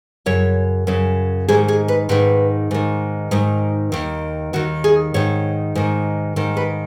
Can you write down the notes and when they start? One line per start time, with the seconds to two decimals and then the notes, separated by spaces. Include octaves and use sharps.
0.26 F#2 C#3 C#5
0.87 F#2 C#3
1.48 G#2 D#3 G#4
1.68 G#4
1.88 B4
2.09 G#2 D#3 B4
2.71 G#2 D#3
3.31 G#2 D#3 D#4
3.92 D#2 D#3
4.53 D#2 D#3 F#4
4.84 G#4
5.14 G#2 D#3 C#5
5.75 G#2 D#3
6.36 G#2 D#3
6.57 B4